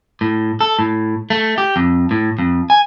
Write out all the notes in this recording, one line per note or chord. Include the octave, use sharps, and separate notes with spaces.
A2
A4
A2
A3
G4
F2
A2
F2
G#5